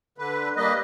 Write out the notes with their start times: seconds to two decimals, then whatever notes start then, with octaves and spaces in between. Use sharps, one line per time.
0.18 D3 B4
0.56 G3 A#3 B4 D#5